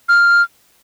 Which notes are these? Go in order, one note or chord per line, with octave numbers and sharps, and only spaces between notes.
F6